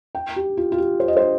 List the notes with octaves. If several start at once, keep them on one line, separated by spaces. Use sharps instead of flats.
G5
G4
F4
F4
G4
C5
D#5
C5